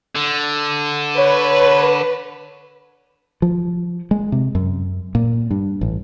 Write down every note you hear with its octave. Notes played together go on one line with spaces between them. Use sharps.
D3
B4 C#5
F3
G#3
C3
F#2
A#2
G2
A1